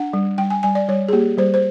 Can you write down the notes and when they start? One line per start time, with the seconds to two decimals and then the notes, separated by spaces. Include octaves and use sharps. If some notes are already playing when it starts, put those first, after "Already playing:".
Already playing: D4 F#5
0.13 G3
0.38 G3 G5
0.50 G#5
0.63 G3 G#5
0.75 D5
0.88 G3 C#5
1.08 G#4
1.12 A#3 G4
1.38 G3 C5
1.54 C5